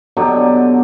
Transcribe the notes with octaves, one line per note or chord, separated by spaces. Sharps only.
B2 D3 F#3 G4